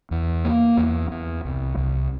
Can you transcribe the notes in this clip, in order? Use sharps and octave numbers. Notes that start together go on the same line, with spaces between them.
E2
A#3
E2
E2
C2
C2